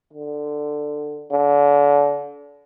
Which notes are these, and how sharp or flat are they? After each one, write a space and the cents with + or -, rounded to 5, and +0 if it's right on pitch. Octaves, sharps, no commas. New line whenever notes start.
D3 +15
D3 -35